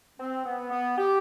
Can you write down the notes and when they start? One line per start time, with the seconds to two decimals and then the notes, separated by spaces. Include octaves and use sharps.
0.19 C4
0.45 B3
0.70 B3
0.97 G4